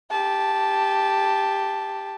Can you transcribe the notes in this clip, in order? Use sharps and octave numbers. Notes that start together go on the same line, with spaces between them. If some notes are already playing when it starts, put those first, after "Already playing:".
G4 A5